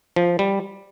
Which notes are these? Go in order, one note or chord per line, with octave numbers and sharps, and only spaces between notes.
F3
G3